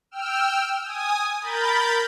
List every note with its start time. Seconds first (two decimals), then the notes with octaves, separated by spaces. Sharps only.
0.11 G5 E6 F6
0.84 G#5 D#6
1.41 A#4 B5 G6 A6